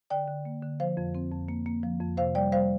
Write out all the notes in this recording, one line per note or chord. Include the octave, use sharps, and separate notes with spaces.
D3 D5 G5
D3
A#3
D3
F3 C5 F5
F2
C4
F2
A#3
A#3
F3
F2
C3 C5 F5
G3 D5 G5
G3 C5 F5